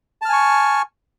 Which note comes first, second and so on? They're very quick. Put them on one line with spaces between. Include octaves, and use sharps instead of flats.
A5 F6 G#5 C#6